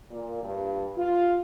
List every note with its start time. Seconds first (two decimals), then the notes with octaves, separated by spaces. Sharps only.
0.11 A#2
0.43 G2
0.97 F4